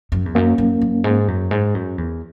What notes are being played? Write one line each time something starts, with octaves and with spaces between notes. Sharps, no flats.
F#2
E2
F#2 A#3 C#4
F#2
F#2
G#2
F#2
G#2
F#2
E2